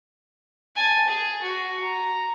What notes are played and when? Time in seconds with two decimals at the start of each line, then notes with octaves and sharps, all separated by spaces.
0.76 G#5 A5
1.08 G#4
1.42 F#4
1.81 A#5